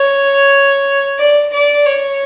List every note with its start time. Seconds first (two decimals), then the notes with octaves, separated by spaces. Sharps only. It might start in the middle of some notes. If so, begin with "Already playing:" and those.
Already playing: C#5
1.19 D5
1.53 D5
1.86 C#5